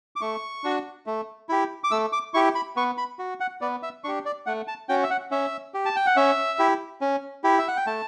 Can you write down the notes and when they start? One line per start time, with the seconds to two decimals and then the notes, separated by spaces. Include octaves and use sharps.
0.16 D6
0.21 A3 C#6
0.64 D4 F#4
1.06 A3
1.49 E4 G4
1.84 D6
1.91 A3 E6
2.12 D6
2.34 E4 G4 C#6
2.55 B5
2.76 B3 C#6
2.98 B5
3.19 F#4
3.40 F#5
3.61 B3 D5
3.83 E5
4.04 D4 G4 C#6
4.25 D5
4.46 A3 F#5
4.68 A5
4.89 C#4 F#4 G5
5.03 E5
5.10 F#5
5.31 C#4 E5
5.74 G4
5.86 A5
5.96 G5
6.06 F#5
6.16 C#4 E5
6.59 E4 G4
7.01 C#4
7.44 E4 G4
7.59 E5
7.68 F#5
7.77 G5
7.87 A3 A5